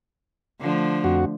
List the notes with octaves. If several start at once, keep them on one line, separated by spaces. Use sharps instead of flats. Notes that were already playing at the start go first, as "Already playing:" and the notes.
D3 F3 A3
F2 F#4